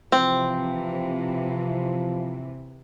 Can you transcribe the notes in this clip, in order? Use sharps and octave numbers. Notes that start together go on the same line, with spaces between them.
C3 E3 F3 C4